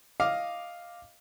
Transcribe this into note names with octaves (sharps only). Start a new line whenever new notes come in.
D#5 F5 D6 F6